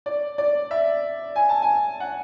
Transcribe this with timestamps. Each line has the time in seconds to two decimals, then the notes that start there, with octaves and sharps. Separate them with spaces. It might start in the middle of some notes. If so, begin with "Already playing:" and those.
0.06 D5
0.38 D5
0.71 E5
1.36 G#5
1.49 A5
1.62 G#5
2.00 F#5